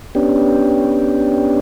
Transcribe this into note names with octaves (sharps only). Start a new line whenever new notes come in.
B3 C#4 D4 G4